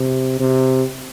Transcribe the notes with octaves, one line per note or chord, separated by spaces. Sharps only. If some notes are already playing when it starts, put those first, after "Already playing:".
Already playing: C3
C3